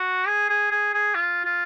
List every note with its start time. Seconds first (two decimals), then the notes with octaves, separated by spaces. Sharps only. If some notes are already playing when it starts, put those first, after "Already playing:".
Already playing: F#4
0.27 G#4
0.50 G#4
0.71 G#4
0.94 G#4
1.15 F4
1.45 F4